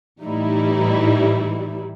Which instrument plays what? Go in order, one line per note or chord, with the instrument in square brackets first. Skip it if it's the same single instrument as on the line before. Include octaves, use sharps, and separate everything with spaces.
[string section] A2 E3 G3 D#4 E4